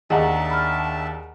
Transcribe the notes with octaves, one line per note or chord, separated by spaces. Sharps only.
D#2 D4 G#4 D#5 E5 F#5 A5 A#5
B5 F6